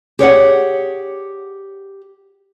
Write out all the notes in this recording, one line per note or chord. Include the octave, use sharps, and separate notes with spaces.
G4 G#4 C#5 D5 F5 F#5